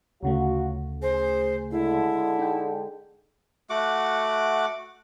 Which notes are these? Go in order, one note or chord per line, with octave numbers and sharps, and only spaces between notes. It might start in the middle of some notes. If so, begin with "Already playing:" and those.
D2 C#3 F#3 A3 F4 F#4
G#4 C5
D3 G#3 E4
D#4 G5
A3 F#4 F#5 D6